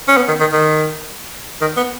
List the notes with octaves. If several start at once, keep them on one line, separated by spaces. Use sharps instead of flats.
C#4
B3
D#3
D#3
D#3
D#3
B3